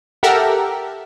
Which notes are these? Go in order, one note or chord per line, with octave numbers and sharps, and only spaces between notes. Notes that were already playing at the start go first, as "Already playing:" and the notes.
G4 A4 A#4 E5 F#5